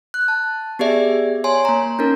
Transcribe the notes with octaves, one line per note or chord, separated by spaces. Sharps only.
F#6
A5
B3 G4 G#4 D5 E5
C#5 G#5 C6
A#3 A#5
C#4 D#4 A#4